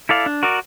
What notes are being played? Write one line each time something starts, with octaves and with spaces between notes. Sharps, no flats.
E4 A4 D5 F5
D4
F#4 A#4 D5